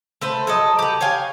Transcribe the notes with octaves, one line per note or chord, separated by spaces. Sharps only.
A3 B4 C5
F#3 A4 D#5
G4 B4
C#5 F5 G5 G#5